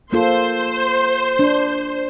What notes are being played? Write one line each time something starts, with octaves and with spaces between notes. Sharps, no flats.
A#3 F4 A4 C5
D4